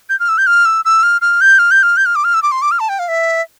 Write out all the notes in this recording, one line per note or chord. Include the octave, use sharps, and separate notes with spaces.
G6
F6
E6
G6
F6
E6
E6
F6
F6
G6
F6
G6
F6
G6
F6
D6
F6
E6
D6
C6
D6
F6
A5
G5
F5
E5